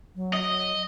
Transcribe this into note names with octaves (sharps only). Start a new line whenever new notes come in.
F#3
D#5